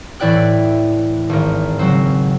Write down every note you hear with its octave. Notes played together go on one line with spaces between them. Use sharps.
A2 E3 E4 D5 G5 F#6
G#1 A#4
C#3 F#3 C4